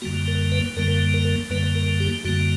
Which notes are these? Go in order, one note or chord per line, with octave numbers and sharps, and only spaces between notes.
F#2 D3 G3 A#3 F#4
A#4
B4
F#2 D3 G3 A#3 A#4
A#4
F#2 D3 G3 A#3 B4
A#4
G4
F#2 D3 G3 A#3 F#4